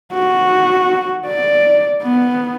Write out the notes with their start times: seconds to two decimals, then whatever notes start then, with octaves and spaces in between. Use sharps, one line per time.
0.14 F#4
1.27 D5
2.03 B3